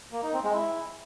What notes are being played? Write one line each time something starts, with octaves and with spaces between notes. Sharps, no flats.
A#3
D#4
C4
G#3
E4